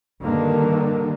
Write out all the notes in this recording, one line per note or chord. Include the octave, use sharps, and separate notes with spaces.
G2 D3 D#3 A#3